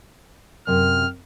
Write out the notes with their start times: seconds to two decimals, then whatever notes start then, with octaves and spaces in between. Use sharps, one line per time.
0.67 F#2 C3 F6